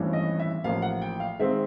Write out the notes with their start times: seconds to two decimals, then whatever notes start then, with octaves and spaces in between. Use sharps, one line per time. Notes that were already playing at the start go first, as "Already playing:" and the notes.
Already playing: G#1 G2 E3 A3 C#4
0.13 D#5
0.39 E5
0.64 A1 A2 F3 A#3 F5
0.82 F#5
1.02 G5
1.20 F5
1.39 G#2 D#3 G#3 C4 E5